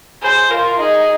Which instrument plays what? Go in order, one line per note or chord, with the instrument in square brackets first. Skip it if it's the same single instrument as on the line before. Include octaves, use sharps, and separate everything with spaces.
[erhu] G#4 [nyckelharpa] C5
[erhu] F4 [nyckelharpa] A#4
[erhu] D#4 [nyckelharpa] G#4